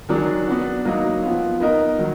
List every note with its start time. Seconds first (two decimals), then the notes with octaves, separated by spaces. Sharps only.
0.09 D#3 F#3 D4 G#4
0.47 B3 D4 F#4
0.85 F#3 A#3 D#4
1.22 F3 B3 F4
1.60 B3 D#4 A#4 D#5
1.99 D#3 F#3